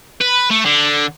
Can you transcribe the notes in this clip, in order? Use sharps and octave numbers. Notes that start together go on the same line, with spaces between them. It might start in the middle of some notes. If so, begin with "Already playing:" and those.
B4
A3
D3